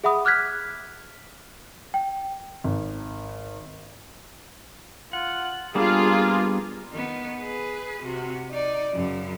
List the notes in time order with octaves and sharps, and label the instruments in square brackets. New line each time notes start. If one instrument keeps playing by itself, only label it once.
[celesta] G#4 E5 F#5 B5 D#6
D6 F6 F#6 G#6 B6
G5
[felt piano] G#1
[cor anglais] F4 [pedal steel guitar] F#5
[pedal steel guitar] G3 B3 D4 [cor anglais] A#3 [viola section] F4 G#4
[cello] D#3 B3
G#4 B4
C3 F#4
D#4 D5
F#2 C#3